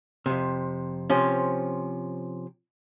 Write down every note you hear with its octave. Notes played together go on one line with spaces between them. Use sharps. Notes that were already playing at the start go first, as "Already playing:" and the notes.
F2 C3
C3 F3 C#4